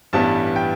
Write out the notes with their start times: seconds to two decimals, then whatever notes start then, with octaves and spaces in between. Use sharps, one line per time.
0.13 A1 G2 E3 G3 B3 A5
0.56 G5